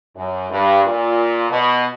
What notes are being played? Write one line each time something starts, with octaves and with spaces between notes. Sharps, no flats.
F#2
G2
A#2
B2